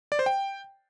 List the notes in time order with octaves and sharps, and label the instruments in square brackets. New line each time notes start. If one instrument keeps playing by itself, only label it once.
[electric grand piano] D5
C5
G5